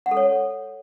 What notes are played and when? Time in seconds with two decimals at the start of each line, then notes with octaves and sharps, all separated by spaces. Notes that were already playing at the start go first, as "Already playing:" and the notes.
0.06 F#5
0.11 A4
0.17 C#5